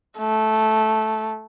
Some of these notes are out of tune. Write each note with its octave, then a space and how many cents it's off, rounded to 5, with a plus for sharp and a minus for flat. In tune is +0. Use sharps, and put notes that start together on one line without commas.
A3 -10